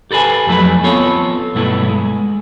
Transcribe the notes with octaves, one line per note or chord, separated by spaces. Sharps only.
G4 A4 B4 C5 G#5
F2 F#3 A3 E4 B4
B3 C4 F4 A4 C#5
B1 G2 A3 B3 E4
G#3